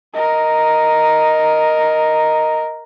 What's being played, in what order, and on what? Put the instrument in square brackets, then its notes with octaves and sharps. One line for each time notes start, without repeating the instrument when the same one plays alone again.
[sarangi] A#4 [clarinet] D#5